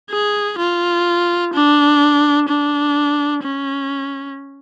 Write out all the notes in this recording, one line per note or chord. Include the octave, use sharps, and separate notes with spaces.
G#4
F4
D4
D4
C#4